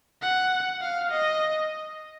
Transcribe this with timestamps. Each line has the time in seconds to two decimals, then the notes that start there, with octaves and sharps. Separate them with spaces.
0.22 F#5
0.81 F5
1.11 D#5